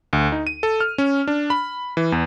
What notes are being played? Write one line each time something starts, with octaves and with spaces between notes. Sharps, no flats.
D2
D#4
D#7
A4
F6
C#4
D4
B5
E3
E2